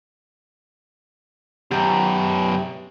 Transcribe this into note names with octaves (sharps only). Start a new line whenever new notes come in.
F#2 B2 G4 A#5